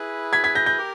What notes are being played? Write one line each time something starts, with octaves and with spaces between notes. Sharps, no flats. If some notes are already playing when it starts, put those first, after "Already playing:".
Already playing: E4 G#4 B4
G#6 B6
G#6 B6
G6 A#6
G6 A#6
G4 A#4